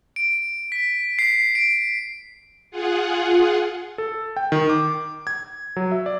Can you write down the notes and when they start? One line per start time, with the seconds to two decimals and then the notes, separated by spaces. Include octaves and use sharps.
0.16 D7
0.72 B6
1.19 C7
1.55 D7
2.71 F4 G#4 F#5
3.98 A4
4.37 G5
4.52 D#3
4.69 D6
5.27 G#6
5.76 F#3
5.92 E5
6.06 D5